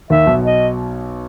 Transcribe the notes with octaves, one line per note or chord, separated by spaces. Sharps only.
D#2 D#3 E5
B1 B2
D#5